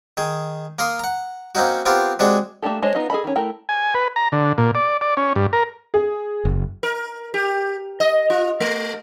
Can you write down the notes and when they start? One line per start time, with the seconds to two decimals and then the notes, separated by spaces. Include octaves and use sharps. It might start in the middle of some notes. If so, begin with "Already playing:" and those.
0.17 D#3 G#4
0.79 A#3 A#4 C6 D#6
0.99 F#5 A#5
1.55 A#3 C4 C#4 D#4 F#4
1.86 B3 C4 F4 G4 A#4
2.19 C3 G#3 D4 F#4 G#4
2.62 A3 A#3 D4 G4 A4
2.83 G#3 D4 C5 C#5 D#5
2.95 B3 D#4 F4 D#5
3.10 G#4 A4 D#5 B5
3.24 D#3 C#4
3.36 A3 E4 A#4 G5 A#5
3.69 G#5
3.95 B4
4.16 A#5
4.32 D3
4.58 A#2
4.75 D5
5.01 D5
5.17 C#4
5.36 G2
5.53 A#4
5.94 G#4
6.45 F#1
6.83 A#4
7.34 G4
8.00 D#5
8.30 F4
8.60 A3